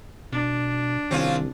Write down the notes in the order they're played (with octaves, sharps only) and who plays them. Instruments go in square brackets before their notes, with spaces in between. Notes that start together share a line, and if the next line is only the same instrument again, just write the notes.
[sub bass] B2 [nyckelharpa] D4
[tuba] C2 [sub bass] D#3 [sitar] C4 C#4 F4